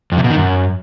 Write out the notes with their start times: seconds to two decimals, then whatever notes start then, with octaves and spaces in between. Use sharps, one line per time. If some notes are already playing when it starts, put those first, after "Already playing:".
0.12 F2
0.18 C3
0.24 B2
0.30 D#3
0.37 F#2